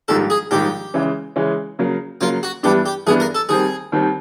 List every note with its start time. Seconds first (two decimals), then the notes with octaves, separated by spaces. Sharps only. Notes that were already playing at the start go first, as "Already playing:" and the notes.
0.08 A#1 G#2 D#3 G3 A4
0.30 G#4
0.51 A#1 G#2 D#3 G3 G4
0.94 C#3 E3 G#3 C#4
1.36 C#3 E3 G#3 C#4
1.79 C#3 F#3 A#3
2.21 C#3 F#3 A#3 F4
2.43 F#4
2.63 G2 E3 G3 B3 D4 G4
2.86 G4
3.06 G2 E3 G3 B3 D4 G#4
3.20 A#4
3.35 A4
3.49 D#2 D#3 G3 C4 G#4
3.92 D#2 D#3 G3 C4